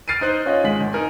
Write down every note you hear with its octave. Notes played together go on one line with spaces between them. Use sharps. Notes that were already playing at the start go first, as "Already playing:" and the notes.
F6 A6 C7 D7 D#7
D#4 C5 F#6
C#4 F4 D#5
G#1 G#3 B6 F#7
G#1
D#4 A#4 G#5